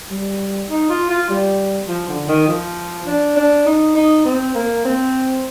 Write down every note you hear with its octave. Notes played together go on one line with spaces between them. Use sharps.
G3
D#4
F4
F4
G3
F3
D3
D#3
F3
D4
D4
D#4
D#4
C4
A#3
C4